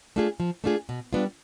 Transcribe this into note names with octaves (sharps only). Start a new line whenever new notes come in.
A3 D4 F4 G#4
F3
A3 D4 F4 G#4
B2
G3 B3 D4 F4